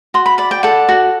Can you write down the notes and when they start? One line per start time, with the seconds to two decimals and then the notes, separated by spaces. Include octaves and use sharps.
0.14 F#4 C6
0.26 B5
0.38 D5 B5
0.51 G5
0.63 A4 F#5
0.89 F#4